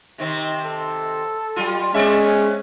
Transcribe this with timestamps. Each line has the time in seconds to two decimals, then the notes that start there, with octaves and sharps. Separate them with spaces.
0.18 C3 D#3 C4
0.66 A4
1.56 F#3 G3 F4
1.94 G#3 B3 C#4 D5 E5